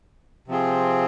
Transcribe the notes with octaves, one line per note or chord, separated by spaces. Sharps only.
C3 F3 C4 F4 G#4